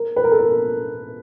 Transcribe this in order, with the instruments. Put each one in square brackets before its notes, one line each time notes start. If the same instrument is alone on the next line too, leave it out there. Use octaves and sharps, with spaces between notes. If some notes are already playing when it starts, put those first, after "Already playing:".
Already playing: [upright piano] A#4
B4
A#4
A4
A#4